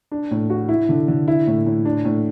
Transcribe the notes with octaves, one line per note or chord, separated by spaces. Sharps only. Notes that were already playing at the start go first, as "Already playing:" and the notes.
D4
A2
F#4
E4
D3
D3
E4
A2
A2
D4
A2